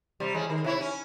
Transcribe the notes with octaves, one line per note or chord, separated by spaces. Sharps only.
C3 G3
E2 G#3 C#4
D#3 A#4
C3 E4 C#5
C#4